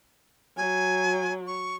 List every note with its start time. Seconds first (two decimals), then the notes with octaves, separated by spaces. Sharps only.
0.57 F#3 G#5
1.47 C#6